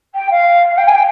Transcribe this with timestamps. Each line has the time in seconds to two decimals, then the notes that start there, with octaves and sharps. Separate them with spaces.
0.15 G5
0.31 F5
0.77 G5
0.87 G#5
0.94 G5